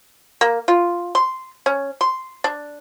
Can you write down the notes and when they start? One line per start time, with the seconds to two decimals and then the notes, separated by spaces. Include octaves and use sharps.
0.41 A#3
0.68 F4
1.15 C6
1.66 C#4
2.01 C6
2.44 D4